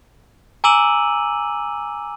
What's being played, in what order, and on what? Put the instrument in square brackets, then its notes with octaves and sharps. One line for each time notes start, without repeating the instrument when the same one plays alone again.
[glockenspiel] G#5 A#5 D6 E6 D#7 F#7